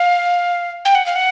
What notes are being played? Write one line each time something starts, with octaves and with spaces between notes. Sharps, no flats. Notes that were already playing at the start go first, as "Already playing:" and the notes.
Already playing: F5
G5
F#5
F5
F#5